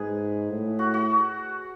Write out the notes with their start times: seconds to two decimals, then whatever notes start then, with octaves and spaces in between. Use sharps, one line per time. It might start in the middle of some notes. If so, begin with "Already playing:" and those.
Already playing: G#2 G#4 B4
0.50 A2
0.79 F#4
0.94 F#4